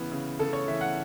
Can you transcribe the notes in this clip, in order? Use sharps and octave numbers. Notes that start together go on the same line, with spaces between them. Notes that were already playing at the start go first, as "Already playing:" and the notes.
Already playing: C#3 E3 B3
C#3
C#3 A4
C#5
E3 E5
F#5